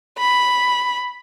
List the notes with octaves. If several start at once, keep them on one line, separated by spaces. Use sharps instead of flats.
B5